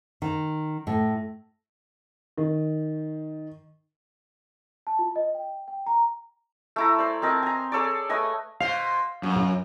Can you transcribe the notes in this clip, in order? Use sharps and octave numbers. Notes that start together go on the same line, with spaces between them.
D#3
A2
D#3
A5
F4
D#5
G5
G5
A#5
A3 E4 A#5
C5 D5
C4 A#4 D#5 A5
G#5 A#5
G#4 A4 C#5 D5
A3 B4 D#5 G#5
B2 C5 F5
F#2 A#3